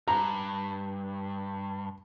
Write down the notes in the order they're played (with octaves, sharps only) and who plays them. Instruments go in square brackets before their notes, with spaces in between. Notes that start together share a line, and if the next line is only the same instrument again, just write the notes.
[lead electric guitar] G2 [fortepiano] A#5